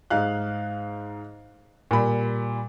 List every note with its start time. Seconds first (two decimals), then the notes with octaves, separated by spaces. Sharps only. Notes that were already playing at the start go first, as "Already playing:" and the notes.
0.10 G#2 D#4 F5 F#6
1.91 A#2 G3 B5